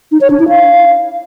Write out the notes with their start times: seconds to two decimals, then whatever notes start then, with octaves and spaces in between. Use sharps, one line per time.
0.12 D#4
0.21 C#5
0.30 D4
0.40 E4
0.49 F5